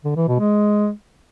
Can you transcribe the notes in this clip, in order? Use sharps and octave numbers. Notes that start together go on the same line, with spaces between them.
D3
E3
B2
G#3